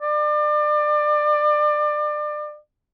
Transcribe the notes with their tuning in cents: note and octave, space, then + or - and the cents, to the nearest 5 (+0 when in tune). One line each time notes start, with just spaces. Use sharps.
D5 +30